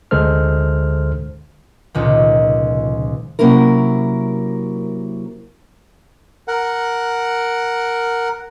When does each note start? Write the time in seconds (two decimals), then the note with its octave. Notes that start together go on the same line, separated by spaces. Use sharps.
0.11 D2 D3 G#3 A4 C5 F6
1.94 F1 C#2 A#2 D#3
3.39 C3 F#3 A#3 C#4 E4 A#4
6.48 A#4 F#5